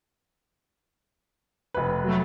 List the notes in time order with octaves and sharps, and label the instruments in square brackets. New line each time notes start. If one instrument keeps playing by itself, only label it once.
[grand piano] F1 B4
[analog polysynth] F#3 A3